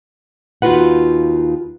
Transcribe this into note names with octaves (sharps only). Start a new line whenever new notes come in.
D#2 D#4 F4 F#4 B4 F#5